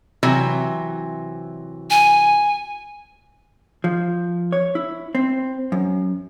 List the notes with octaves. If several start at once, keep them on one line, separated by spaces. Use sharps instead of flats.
C3 E3 F#3
G#5
F3
C#5
E4
C4
F#2